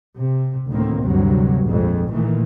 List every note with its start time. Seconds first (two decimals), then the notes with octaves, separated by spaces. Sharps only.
0.18 C3
0.69 D2 A2 D#3 A#3 C4
1.02 D2 G2 C3 F#3
1.65 A#1 F2 C3 G#3
2.11 A#2 D#3 E3 A3